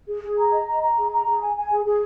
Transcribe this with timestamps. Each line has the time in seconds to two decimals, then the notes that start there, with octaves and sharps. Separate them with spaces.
0.08 G#4
0.24 G#4
0.38 A#5
0.53 D#5
0.67 A#5
0.82 A#5
0.97 G#4
1.11 A#5
1.26 G#4
1.41 G#5
1.56 G#5
1.70 G#4
1.85 G#4